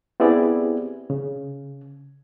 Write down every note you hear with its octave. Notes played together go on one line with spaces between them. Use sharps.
B3 C4 E4 G4 G#4 D5
C#3